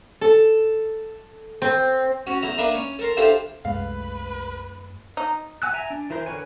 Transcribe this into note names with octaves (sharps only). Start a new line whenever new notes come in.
A4
C4
C#4 F#4
E2 E4 A#5
A#3 D4 A#4 B4 D5 E5
C#4
A4 A#4 C6
D4 E4 F4 G4 A4 C5
C2 F#2 G#3 A3 B4 F5
D#4
F#5 G#5 E6 F#6
E5 G#5 A#5
D4
E3 E4 A#4 C5
D3 A#4 B4 C#5 G#5